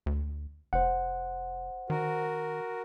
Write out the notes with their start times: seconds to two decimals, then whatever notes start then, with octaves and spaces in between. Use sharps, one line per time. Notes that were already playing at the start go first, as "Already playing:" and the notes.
0.06 D2
0.73 F1 C5 F#5
1.90 D#3 F#4 A#4